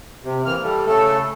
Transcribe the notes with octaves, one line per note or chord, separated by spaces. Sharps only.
C3
E3 A#3 F6
G3 A3
C#3 A3 A4